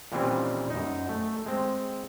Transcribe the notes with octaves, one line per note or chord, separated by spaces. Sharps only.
A#2 D#3 E3 G3 C4 C#4
F#2 D#4
A3
G#3 C4